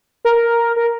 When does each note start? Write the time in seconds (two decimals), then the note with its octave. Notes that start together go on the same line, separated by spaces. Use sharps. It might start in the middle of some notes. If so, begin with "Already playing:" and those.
0.25 A#4
0.76 A#4